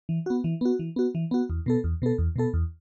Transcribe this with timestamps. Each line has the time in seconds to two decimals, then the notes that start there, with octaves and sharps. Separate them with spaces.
0.09 E3
0.26 B3 F#4
0.44 E3
0.61 B3 F#4
0.79 E3
0.96 B3 F#4
1.15 E3
1.31 B3 F#4
1.50 E2
1.66 B2 B3 A4
1.84 E2
2.02 B2 B3 A4
2.18 E2
2.36 B2 B3 A4
2.54 E2